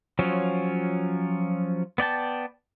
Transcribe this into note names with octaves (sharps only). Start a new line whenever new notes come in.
F3 F#3 C#4 F4
B3 D5 G5 A5